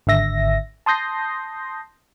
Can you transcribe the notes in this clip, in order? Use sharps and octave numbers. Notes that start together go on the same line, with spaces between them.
G#1 D3 E5 A#6
A5 C6 D#6 G6 A#6 C7